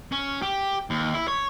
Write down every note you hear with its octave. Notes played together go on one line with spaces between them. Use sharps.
C#4
G4
D#2
E4
C#5